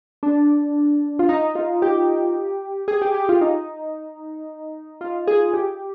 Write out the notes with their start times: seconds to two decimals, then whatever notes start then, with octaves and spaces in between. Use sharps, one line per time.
0.23 D4
1.19 F4
1.29 D#4
1.55 F4
1.82 G4
2.88 G#4
3.02 G4
3.14 G4
3.29 F4
3.41 D#4
5.01 F4
5.27 G#4
5.54 G4